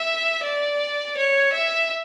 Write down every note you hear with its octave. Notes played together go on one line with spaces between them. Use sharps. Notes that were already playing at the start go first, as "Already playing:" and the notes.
Already playing: E5
D5
C#5
E5